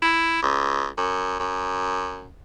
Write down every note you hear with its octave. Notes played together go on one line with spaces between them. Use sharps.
E4
C#2
F#2
F#2